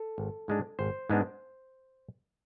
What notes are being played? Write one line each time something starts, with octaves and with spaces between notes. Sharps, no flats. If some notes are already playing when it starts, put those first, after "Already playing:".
Already playing: A4
G#1
G#2 G#3 D4
G#1 C5
G#2 G#3 B3 D4